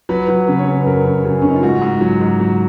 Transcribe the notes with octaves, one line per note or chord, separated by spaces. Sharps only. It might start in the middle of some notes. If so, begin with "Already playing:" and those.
F#3 B4
F#3 B4
C#3 B4
C#5
C#3 B4
B4
F#2 A#4
F#2
F#2 G#4
C#3 C#4
D#4
F4
G#2 F#4
G#2
F#3
G#2
F#3